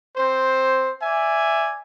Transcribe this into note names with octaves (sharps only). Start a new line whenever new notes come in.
C4 C5
D5 E5 G#5